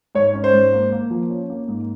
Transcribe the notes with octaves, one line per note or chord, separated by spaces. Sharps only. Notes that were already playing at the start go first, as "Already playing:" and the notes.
G#2 C#5
C#4
C5
G#2
A#3
A#3
F3
C#4
A#3
G#2